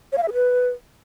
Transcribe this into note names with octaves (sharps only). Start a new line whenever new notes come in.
C#5
F5
E5
G#4
B4